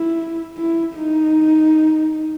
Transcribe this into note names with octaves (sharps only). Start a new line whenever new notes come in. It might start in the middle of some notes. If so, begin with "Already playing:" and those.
Already playing: E4
E4
D#4